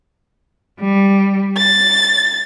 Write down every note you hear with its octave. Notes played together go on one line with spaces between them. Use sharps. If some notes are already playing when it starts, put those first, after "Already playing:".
G3
A6